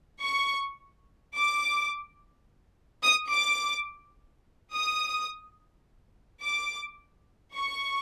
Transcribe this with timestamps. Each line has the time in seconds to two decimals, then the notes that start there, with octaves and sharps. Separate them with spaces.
0.22 C#6
1.35 D6
3.04 D#6
3.32 D6
4.74 D#6
6.43 D6
7.55 C#6